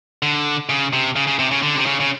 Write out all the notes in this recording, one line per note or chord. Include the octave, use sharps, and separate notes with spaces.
D3
C#3
C3
C#3
C#3
C3
C#3
D3
C3
C#3
C#3